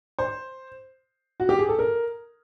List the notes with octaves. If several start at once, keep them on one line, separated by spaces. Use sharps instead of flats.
C5
F#4
G4
G#4
A4
A#4